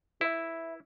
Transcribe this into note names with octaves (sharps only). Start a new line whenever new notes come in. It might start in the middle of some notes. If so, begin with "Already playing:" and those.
E4 B4 E5